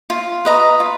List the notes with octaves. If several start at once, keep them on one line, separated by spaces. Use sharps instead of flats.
F4
B4 D#5 A#5
F4